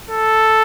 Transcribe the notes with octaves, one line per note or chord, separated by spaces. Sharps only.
A4